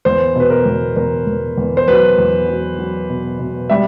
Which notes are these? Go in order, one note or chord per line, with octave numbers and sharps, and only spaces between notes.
E2 C5
B2 B4
A#4
E2
E2 A#4
E2
E2
C5
F#3 B4
E2
F#3
F#3
B2
B2
G3 E5